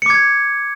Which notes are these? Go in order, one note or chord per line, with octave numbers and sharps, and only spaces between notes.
D6 G#6 C#7